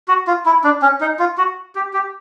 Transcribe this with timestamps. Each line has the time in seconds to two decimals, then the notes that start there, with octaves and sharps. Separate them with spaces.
0.08 F#4
0.27 F4
0.46 E4
0.64 D4
0.82 C#4
1.01 D#4
1.19 F4
1.38 F#4
1.75 G4
1.93 G4